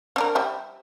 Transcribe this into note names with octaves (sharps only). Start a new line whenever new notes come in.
C4 D4 A#4
G3 C5 E5